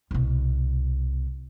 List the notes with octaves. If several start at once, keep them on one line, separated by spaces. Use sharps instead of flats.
C2 B2